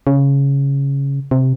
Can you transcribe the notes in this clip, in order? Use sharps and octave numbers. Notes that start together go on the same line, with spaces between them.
C#3
C3